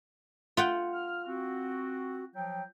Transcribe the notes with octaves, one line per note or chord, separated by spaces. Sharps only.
F4 F#5 G5
F6
C4 F#4
F3 F#3 G5